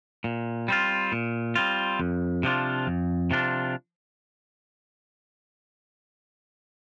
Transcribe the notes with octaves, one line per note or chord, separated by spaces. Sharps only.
A#2
G3 C4 F4
A#2
G3 C4 F4
F2
C3 F3 D4 F4
F2
C3 F3 D4 F4